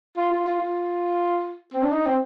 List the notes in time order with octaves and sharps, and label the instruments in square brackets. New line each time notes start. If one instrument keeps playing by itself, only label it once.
[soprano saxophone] F4
F4
F4
F4
C4
D4
D#4
C4